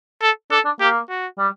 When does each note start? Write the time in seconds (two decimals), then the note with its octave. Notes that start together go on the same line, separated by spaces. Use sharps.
0.22 A4
0.51 D4 A4
0.65 D4
0.81 A#3 G4
1.10 F#4
1.39 G3